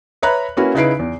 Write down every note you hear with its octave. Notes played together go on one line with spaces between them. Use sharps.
B4 C#5 E5 A#5 B5 F#6
A#3 C#4 E4 F#4 B4
C#3 D#4 E4 B4 C7 D7
E2